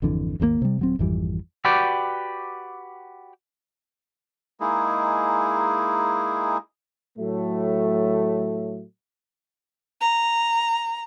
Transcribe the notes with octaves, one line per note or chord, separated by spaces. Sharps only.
G#1 F2 D3 E3
G#1 D#2 C3 A#3
C3 G3
D#1 F#3 C4
G#1 F2 E3 G3
F#4 G4 B4 D5 G5
G#3 A#3 D#4 E4 G#4
A2 F#3 A3
A#5